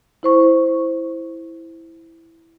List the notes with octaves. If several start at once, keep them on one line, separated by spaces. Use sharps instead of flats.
E4 C5 C#6